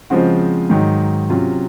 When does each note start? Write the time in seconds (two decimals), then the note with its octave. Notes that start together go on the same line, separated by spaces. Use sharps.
0.10 C#3 F3 G#3 C4 F#4
0.70 G#2 D#3 F#3
1.30 C3 F#3 C#4 F4